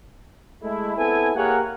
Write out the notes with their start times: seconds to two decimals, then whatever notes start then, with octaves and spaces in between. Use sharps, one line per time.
0.63 G#3 A3 E4
0.97 B3 C4 E4 A4 G#5
1.35 A#3 G4 G#4 A#4 C#5 F#5